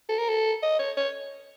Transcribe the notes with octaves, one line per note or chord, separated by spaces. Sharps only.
A4
A#4
A4
D#5
C#5
C#5